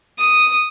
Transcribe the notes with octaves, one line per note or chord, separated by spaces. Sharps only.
D#6